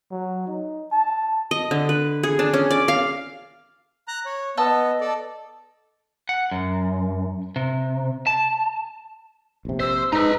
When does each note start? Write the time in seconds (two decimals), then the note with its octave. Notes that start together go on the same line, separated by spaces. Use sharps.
0.11 F#3
0.47 D#4
0.92 A5
1.51 D#5
1.71 D3
1.89 B4
2.23 G#4
2.39 D4
2.54 C#4
2.71 D5
2.88 F5
4.08 A#5 F#6
4.25 C#5
4.57 B3 D#5 A5 E6
5.01 A4 D5
6.29 F#5
6.51 F#2
7.56 C3
8.27 A5
9.65 A#1 C3
9.80 C5 E6
10.13 G#2 D#4 B4 A#5